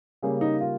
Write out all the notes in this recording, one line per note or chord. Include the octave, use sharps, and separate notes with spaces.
C#3 G3 A#3 G#4
D#4
F4